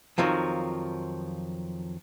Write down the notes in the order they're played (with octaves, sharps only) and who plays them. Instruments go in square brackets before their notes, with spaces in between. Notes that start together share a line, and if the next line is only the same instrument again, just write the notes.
[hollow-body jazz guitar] F2 D#3 F3 F#3